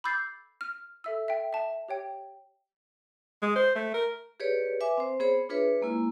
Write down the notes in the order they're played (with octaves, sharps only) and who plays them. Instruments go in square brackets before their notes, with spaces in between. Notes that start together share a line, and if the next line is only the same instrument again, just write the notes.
[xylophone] B5 D6 E6 G6 A6 C7
F6
A4 E5 E6
E5 G5
E5 A5
G4 C#5 G5
[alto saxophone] G#3
C5
A3
A#4
[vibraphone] G4 G#4 B4 C#5 D5
B4 E5 G#5 D6
C4 C5
B3 G#4 C5 C#5
D4 F4 G#4 B4 C#5 E5
G#3 A#3 E4 F4